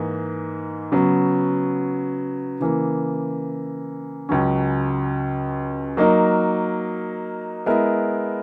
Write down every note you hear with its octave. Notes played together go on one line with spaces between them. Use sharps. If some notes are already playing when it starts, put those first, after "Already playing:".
Already playing: G#2 E3 A#3
C#3 F#3 B3
C#3 E3 A#3
C#2 C#3 F#3 C#4
F#3 A#3 D#4 A#4
G#3 B3 E4 A#4